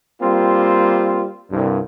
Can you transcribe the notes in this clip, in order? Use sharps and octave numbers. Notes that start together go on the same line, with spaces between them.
G3 A#3 C4 F4
C2 G2